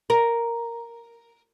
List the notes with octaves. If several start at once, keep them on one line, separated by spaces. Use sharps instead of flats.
A#4